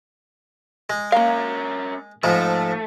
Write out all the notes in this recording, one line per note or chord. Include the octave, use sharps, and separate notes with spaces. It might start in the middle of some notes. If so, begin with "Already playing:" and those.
G#3
A#3 C#4 A#4 F5
G#2 F3 G#3 A3